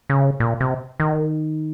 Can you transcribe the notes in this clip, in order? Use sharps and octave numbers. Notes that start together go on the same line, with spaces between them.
C#3
A#2
C3
D#3